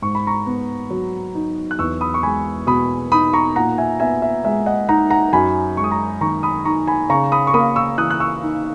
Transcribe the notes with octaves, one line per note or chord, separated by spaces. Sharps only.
G#2 C#6
B5
A#5 C#6
B3
F#3
D#4
F#6
E2 C#6 E6
B5 D#6
C#6
G#3 G#5 B5
B2 B5 D#6
D#4 B5 D#6
A#5 C#6
A#2 F#5 A#5
E5 G#5
B3 E5 G#5
E5
G#3 E5
D#5 F#5
D#4 F#5 A#5
F#5 A#5
F#2 G#5 B5
G#3 C#6
D#6
A#5 C#6
D#3 A#5 C#6
B5 D#6
D#4 A#5 C#6
G#5 B5
C#3 A#5 C#6
B5 D#6
C#6
A#3 B5 D#6
C#6 E6
E3 D#6 F#6
F#6
C#6 E6
D#4